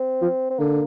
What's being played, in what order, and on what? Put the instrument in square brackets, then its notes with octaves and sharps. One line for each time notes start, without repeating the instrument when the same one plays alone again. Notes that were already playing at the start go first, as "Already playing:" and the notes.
Already playing: [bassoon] C4
[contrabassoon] F3
[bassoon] C4
[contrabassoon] D3 [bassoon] A#3